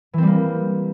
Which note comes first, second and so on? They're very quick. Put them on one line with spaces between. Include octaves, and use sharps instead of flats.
E3 C4 G3 A#3